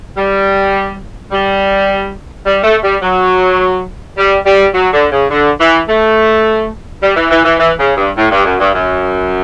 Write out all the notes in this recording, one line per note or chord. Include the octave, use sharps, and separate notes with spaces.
G3
G3
G3
A3
G3
F#3
G3
G3
F#3
D3
C#3
D3
E3
A3
G3
E3
E3
E3
E3
C#3
G2
A2
G2
F#2
G2
F#2